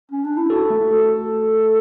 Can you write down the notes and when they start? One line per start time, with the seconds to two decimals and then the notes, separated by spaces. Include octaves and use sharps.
0.11 C#4
0.24 D4
0.37 E4
0.50 F#4 A4
0.70 A3
0.91 A4